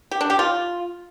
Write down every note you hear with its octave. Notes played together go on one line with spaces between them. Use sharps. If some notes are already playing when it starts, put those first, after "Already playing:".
G4
D4
G4
F4